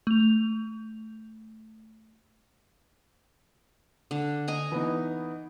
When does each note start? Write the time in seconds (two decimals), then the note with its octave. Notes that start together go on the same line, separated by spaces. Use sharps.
0.07 A3 F7
4.11 D3
4.48 D#5 G#5 A#5
4.72 E3 B3 D#4